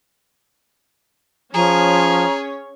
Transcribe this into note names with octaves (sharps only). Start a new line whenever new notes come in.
F3 C#4 G#4 C#5 A#5